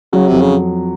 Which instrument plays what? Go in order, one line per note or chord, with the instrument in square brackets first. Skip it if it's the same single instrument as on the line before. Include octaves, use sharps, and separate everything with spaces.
[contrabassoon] C#3 [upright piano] F#3
[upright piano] F2 [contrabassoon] C3
[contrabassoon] C#3